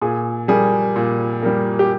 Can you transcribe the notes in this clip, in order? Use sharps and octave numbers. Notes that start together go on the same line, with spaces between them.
A#2 G#4
G3 A#3 G#4
A#2
G3 A#3
G4